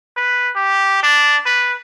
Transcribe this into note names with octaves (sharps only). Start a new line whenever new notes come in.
B4
G4
D4
B4